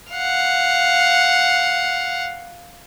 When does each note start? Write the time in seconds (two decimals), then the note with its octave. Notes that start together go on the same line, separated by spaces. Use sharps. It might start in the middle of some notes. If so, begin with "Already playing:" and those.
0.12 F5 F#5